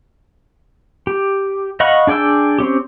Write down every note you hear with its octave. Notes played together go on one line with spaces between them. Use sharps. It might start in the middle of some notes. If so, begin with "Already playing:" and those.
G4
D#5 F5 F#5 B5 C#6
D4 G#4 D5 G5 E6
C4 C#4 G4